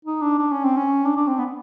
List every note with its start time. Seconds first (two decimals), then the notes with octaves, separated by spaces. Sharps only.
0.05 D#4
0.22 D4
0.39 D4
0.52 C#4
0.64 C4
0.77 C#4
1.06 D4
1.17 D4
1.28 C4
1.39 B3